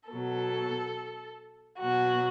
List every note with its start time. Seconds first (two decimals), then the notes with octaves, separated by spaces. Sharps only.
0.11 B2 F#3 A4
1.80 B2 F#3 F#4